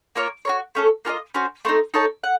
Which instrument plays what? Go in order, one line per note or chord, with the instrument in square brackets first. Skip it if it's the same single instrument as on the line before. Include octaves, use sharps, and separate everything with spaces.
[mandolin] A#3 F4 A#4 C#5
F#4 A#4 C#5
A3 C#4 A4
A#3 F4 A4 D#5
C#4 F#4 C5
A3 C4 D#4
D#4 A4 C#5 A5
F#5